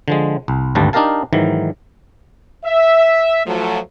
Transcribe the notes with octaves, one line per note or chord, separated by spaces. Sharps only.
D3 F3 G#3
C2
G#1 D2 G2 G3 A5
D4 D#4 G4 A#4 F5 A5
G#2 D#3 E3 F#3
E5
F3 F#3 A3